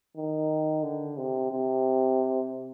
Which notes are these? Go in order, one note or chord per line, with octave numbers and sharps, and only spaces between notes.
D#3
D3
C3
C3